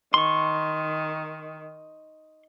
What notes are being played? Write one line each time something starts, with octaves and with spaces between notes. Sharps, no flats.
D#3 C6 C#6